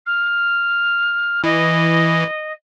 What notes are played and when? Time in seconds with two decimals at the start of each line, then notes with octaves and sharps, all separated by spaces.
0.06 F6
1.44 E3 D#5